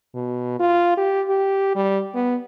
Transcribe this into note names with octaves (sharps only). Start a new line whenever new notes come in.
B2
F4
G4
G4
G3
B3